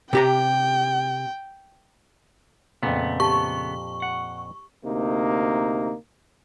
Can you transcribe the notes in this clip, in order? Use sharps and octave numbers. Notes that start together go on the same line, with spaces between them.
C3 G4 G5 A#5
F2 A#2 C#3 A3 B3
G4 A5 C6 C#6
F#5
D2 C3 A#3 D#4